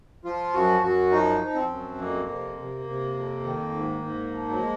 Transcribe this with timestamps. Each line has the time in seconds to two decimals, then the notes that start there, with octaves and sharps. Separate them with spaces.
0.25 F3 F4
0.53 F#2 F#4
0.82 F#2 F#4
1.11 F3 D#4
1.41 F3
1.55 C4
1.69 F#2
1.98 F2 A#3
2.28 C3
2.57 C3
2.86 C3
3.15 F2
3.43 D#3
3.72 G#2
4.02 G#2
4.31 F3
4.49 F#3
4.60 G#3